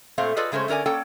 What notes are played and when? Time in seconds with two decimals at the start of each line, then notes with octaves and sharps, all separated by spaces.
0.18 A#2 A3 C4 C5 F5
0.37 F4 G#4 A4 B4 D5 D#5
0.52 C#3 G#3 A3 C#4 C5
0.68 D3 C#4 A#4 D5 G#5
0.86 A#3 C#4 A4 D5 G5